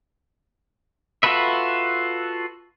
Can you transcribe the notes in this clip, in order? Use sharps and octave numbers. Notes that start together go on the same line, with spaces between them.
F4 F#4 A4 B4 E5